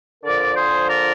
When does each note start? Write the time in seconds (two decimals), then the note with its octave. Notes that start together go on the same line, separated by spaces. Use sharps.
0.24 D3 F3 A#4 D5
0.56 G#4 C5
0.88 A#4 D5